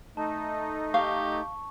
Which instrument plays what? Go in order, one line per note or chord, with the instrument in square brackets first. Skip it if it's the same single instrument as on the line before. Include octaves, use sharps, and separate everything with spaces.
[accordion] A3 D#4 [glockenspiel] A5
[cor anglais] G4 [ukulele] F5 [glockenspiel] C#6